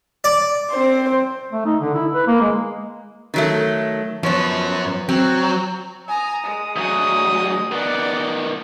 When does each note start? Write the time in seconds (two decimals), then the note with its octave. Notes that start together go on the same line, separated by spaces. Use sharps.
0.24 D5
0.71 C4 C5
1.52 A3
1.65 D#4
1.81 D3
1.94 E4
2.13 B4
2.27 A#3
2.41 G#3
3.34 D#3 F#3 A3
4.23 F#2 F3 B3 C#5
5.09 F#3 C4
6.08 G#5 A#5 D#6
6.44 G#3
6.76 D2 F#3 D#6
7.72 D#3 B3 D5 F#5 D6